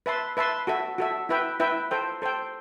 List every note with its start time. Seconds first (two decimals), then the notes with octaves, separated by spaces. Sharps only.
0.06 B4 E5 A5 C6
0.37 B4 E5 A5 C6
0.67 F#4 A4 E5
0.98 F#4 A4 E5
1.29 E4 B4 E5 G5
1.60 E4 B4 E5 G5
1.91 A4 C5 G5
2.22 A4 C5 G5